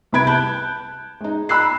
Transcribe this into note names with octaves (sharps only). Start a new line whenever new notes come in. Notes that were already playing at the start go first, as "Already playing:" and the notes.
C2 C3 B3 B5 G#6 D7
A5 F#6 G6
G#3 D#4
A#5 B5 E6 F#6 C7